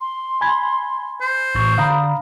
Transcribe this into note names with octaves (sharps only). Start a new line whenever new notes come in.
C6
G#5 B5 G#6
C5
A1 C#6
D3 F5 A#5 B5 D#6